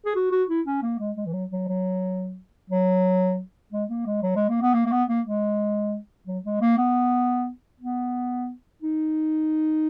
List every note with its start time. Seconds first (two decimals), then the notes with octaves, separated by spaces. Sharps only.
0.06 G#4
0.15 F#4
0.32 F#4
0.49 E4
0.66 C#4
0.82 A#3
0.99 G#3
1.17 G#3
1.26 E3
1.33 F#3
1.51 F#3
1.68 F#3
2.70 F#3
3.72 G#3
3.89 A#3
4.06 G#3
4.23 F#3
4.36 G#3
4.49 A#3
4.62 B3
4.74 A#3
4.86 A#3
4.92 B3
5.09 A#3
5.25 G#3
6.27 F#3
6.45 G#3
6.61 A#3
6.78 B3
7.80 B3
8.82 D#4